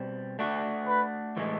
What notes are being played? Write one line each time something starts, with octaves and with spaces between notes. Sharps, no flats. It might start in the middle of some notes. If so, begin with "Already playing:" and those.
Already playing: B2 G3 C4
A3 D4 F#4
B4
A2 E3 G#3